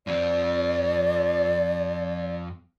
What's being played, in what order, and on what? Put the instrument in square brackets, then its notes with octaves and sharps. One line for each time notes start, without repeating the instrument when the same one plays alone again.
[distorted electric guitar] F2 C4 [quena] D5